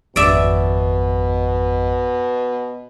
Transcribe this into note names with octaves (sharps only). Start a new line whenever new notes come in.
G#1 F2 B2 D5 E5